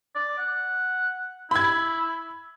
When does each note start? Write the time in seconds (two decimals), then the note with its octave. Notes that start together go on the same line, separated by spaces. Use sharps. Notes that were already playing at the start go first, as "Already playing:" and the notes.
0.15 D5
0.38 F#5
1.51 E4 B5 G#6